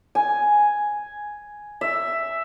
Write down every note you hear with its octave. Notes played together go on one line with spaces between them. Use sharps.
G#5
E5